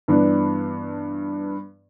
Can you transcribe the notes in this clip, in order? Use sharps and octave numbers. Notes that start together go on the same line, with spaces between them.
G2 E3 B3 D4